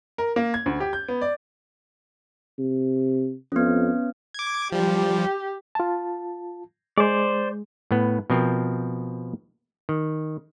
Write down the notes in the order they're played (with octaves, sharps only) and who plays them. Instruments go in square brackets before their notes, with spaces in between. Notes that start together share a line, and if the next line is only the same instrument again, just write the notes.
[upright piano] A#4
A#3
G#6
D2
G4
G6
B3
D5
[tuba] C3
[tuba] F2 [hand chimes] B3 C#4
[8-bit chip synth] D6 G#6
[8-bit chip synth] F3 G3 [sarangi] G4
[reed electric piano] F4 A5
[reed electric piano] G#3 [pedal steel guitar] C5 D5
[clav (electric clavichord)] A2 B3
B2 F3 C4 A#4
D#3